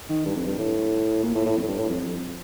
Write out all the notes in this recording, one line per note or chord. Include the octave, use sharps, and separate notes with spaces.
D#3
G2
F2
G2
A2
A#2
A2
A2
F2
A2
G2
A2
F2
F2